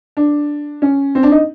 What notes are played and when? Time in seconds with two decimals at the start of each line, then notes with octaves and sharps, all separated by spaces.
0.17 D4
0.82 C#4
1.15 C4
1.23 D4
1.31 D#4